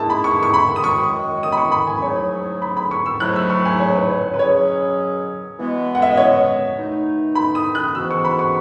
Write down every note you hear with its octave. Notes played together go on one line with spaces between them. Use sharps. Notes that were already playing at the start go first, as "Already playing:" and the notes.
Already playing: D#3 A3 E4 G#4 A5 E6
B5
C#6
C#6
B5
D#6
F#2 D#3 G#3 C#6
D#6
B5
C#6
B5
G#5
G#2 F#3 A3 E4 G#4 C#5
B5
B5
C#6
E6
G#2 F#3 A3 E4 F#6
E6
C#6
G#5
C#5
B4
C#5
B4
B2 F#3 C#4 G#4 C#5
E3 G#3 B3 F#4
F#5
E5
D#5
C#5
B2 A3 D#4
B5
D#6
F#6
G#2 E3 B3 F#4 E6
C#6
B5
C#6